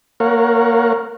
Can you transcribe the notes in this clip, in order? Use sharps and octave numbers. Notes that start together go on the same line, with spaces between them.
A#3 A#4 C#5 F5 F#5